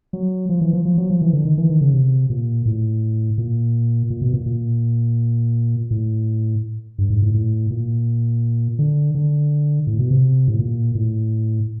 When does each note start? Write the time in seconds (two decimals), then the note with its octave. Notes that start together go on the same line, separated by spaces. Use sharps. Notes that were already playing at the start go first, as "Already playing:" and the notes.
0.13 F#3
0.49 F3
0.61 E3
0.73 F3
0.85 F3
0.98 F#3
1.10 F3
1.22 E3
1.33 D3
1.45 D#3
1.58 E3
1.70 D#3
1.81 C#3
1.94 C3
2.30 A#2
2.65 A2
3.38 A#2
4.10 A#2
4.22 B2
4.34 A#2
4.46 A#2
5.91 A2
6.98 G2
7.10 G#2
7.22 A2
7.34 A2
7.71 A#2
8.79 D3
9.15 D3
9.87 A2
9.99 B2
10.11 C3
10.48 A2
10.59 A#2
10.95 A2